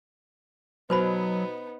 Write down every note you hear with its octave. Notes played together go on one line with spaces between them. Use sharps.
B2 F#3 B3 D#4 B4 C5 B5